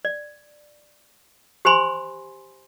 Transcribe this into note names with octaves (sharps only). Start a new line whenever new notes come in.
D5
G4 C5 G#5 B5 C6